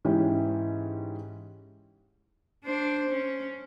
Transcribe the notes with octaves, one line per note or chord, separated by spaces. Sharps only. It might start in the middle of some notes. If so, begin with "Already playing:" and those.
G#2 E3 C#4 E4 G4
D4 C5
C#4